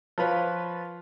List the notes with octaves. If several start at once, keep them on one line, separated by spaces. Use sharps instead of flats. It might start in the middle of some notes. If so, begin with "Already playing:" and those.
F3 F4 B4 C#5